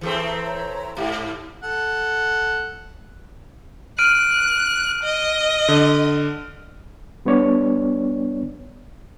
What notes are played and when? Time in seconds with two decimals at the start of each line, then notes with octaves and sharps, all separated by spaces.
0.01 E3 A3 C4 G#4 D#6
0.26 A#5
0.46 C#5 A#5
0.97 G#2 G4 E5
1.63 A4 F#5
3.99 F6 F#6 D7 D#7
5.04 D#5
5.68 D3
7.25 G3 B3 D4 C#5 D5